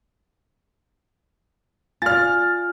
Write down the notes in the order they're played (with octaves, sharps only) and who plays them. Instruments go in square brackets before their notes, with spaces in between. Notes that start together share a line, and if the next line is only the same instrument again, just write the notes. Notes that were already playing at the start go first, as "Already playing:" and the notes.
[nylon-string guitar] F4 D5 [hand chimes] G#5 [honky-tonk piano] F6 A6